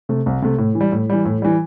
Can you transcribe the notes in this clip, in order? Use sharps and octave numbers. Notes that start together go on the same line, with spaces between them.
C3 A3
C2
C3 A3
A2
E3
G3
A2
E3 G3
A2
E3 G3